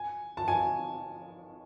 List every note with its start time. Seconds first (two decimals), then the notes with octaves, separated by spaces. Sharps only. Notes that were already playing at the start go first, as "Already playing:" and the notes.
Already playing: G#5
0.37 A5
0.48 G#5